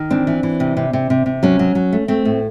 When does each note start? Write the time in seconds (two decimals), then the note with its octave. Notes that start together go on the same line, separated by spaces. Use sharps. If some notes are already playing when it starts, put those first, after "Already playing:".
Already playing: D#3
0.10 E3 C4 D4
0.27 E3
0.43 E3
0.60 C3
0.77 C3
0.93 C3
1.10 C3
1.26 C3
1.43 F#3 C#4
1.59 F#3
1.75 F#3
1.93 A3
2.08 A3 C4
2.25 A2